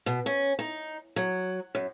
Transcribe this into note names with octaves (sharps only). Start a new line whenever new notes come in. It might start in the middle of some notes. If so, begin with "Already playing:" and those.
B2
C#4
D#4
F#3
F#2